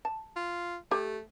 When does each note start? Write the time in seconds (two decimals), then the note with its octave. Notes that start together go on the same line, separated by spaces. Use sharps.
0.05 A5
0.36 F4
0.91 A3 G4